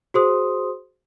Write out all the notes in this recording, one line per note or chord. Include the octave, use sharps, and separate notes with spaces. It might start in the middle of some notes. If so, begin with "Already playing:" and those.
F#4 G#4 C5 C6 D#6